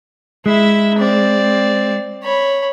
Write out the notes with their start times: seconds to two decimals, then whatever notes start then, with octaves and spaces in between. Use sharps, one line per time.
0.46 G#3 E4 E5
0.98 C4 D5
2.23 C#5 B5